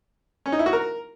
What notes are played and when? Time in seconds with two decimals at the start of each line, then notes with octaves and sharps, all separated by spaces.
0.46 C#4
0.52 D#4
0.59 E4
0.66 F#4
0.73 A#4